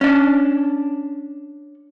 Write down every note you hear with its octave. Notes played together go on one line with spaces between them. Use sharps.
C#4 D4